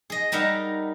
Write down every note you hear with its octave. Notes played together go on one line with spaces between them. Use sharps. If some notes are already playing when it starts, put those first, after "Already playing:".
G#4 D#5
G3 D#4 A#4 E5 F#5